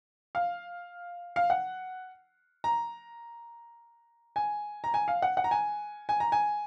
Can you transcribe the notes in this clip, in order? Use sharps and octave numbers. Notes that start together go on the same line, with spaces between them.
F5
F5
F#5
A#5
G#5
A#5
G#5
F5
F#5
F#5
A#5
G#5
G#5
A#5
G#5